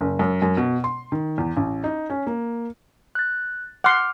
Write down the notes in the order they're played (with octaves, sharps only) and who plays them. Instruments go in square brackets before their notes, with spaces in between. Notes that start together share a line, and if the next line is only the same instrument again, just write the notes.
[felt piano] F#1
F#2
F#2
B2
C6
D#3
E2
A1
D#4
C#4
A#3
[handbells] F#6 A6
[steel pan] F#5 C6 [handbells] D6 F6